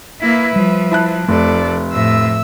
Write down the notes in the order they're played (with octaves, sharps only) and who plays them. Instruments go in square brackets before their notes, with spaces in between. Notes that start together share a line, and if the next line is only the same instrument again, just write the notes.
[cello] A#3 E4 [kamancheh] B4 E5
[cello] F3 [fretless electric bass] G3
[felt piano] E4 A5 F#6
[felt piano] F1 [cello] F2 [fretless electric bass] A3 [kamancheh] A4 D5
[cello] A2 F3 [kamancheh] E5 E6